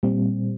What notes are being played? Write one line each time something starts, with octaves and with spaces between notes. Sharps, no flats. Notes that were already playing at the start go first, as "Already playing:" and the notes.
A#2 G3 C4